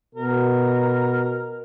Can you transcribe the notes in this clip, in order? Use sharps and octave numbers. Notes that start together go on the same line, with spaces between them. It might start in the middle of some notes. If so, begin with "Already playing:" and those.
B2 A#4